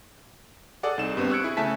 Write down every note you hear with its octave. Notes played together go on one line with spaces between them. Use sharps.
G#4 A4 D5 F#5
C2 D#4 E7
G2 B3 C4
C#6 E6 F#6 G#6 C#7 D7
E4 G#4
C#3 A3 E5 G#5 A5 B6